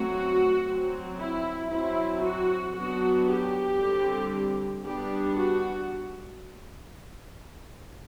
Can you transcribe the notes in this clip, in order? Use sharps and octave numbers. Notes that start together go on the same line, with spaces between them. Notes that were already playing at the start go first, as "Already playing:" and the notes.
Already playing: F#3 A3 C4 F#4
F#3 C4
E4
F#3 C4 E4
F#4
F#3 B3 D4 F#4
G4
D3 G3 C4
G3 B3 D4 G4
F#4